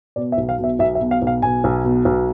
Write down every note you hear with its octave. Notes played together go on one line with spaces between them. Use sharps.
B2 D5
E5
B1
F5
B2
E5
B1 E5
E5
B2
F5
B1
F5
B2 G#5
B1
B2
B1